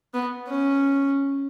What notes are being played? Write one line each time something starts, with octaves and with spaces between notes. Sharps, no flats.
B3
C#4